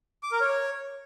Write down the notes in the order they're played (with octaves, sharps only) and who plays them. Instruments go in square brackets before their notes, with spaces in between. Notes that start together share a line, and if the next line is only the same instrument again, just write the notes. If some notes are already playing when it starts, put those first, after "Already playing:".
[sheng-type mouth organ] D6
A#4
C#5